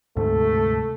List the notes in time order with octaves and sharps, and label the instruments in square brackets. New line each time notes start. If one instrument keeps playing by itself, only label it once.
[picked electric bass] D2 G#2 C3 [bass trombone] A3